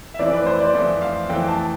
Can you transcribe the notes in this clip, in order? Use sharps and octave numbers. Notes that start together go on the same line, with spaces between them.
E5
F2 E3 A3 C4 D5
B4
C5
D5
F2 E3 A3 C4
F5
F2 E3 A3 C4 G5
A5